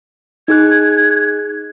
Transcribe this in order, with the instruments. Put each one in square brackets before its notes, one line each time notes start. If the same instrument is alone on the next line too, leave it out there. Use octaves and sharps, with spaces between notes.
[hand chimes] D#4 G#4 F#6 [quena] G#6